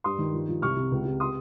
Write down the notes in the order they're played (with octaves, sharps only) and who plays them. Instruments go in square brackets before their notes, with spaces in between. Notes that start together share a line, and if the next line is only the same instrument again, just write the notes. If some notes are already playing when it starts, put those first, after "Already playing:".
[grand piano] G2 C6 D#6
D#3
F3
F3
C2 C#6 F6
C3
C#2
C3
C6 D#6